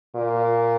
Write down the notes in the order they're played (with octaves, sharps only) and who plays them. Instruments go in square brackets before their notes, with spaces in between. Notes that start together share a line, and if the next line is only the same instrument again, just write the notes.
[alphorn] A#2